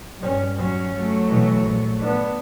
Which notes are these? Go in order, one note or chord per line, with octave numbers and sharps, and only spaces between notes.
G2 C#4
F#3 C#4
F#3 A3
B2 E3
A#1
B3 D4